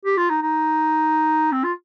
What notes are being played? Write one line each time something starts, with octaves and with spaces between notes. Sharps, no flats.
G4
F4
D#4
D#4
C4
F4